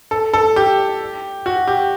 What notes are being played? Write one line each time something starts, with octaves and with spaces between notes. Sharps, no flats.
A4
A4
G4
F#4
G4